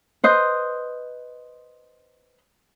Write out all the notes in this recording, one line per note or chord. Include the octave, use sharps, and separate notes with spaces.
B4 C5 D#5